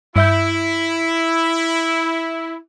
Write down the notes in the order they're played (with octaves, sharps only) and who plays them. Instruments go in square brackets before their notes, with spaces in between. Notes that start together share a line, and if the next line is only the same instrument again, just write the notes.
[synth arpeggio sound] G2 E5 G6 [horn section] E4